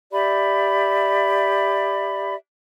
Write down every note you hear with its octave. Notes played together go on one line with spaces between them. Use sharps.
G4 D5 E5 B5